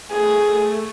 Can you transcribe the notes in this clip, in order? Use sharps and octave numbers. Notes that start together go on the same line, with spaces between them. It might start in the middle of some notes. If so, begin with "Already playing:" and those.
A3 G#4